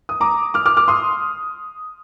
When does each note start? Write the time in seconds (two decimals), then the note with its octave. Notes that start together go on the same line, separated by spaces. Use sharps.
0.09 D#6
0.21 A#5 D6
0.54 D6 F6
0.66 D6 F6
0.77 D6 F6
0.88 C6 D#6